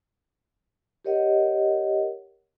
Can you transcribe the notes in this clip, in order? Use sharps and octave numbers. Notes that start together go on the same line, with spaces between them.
G4 A#4 C#5 D#5 F#5